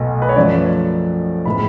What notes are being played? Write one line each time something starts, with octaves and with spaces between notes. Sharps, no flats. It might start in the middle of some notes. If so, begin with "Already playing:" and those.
Already playing: B1 B2 A3
B4
C#5
F#2 F3 A3 D5
A2 G#3 B3 B5